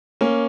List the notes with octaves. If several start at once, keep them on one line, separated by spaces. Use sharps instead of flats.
A#3 C#4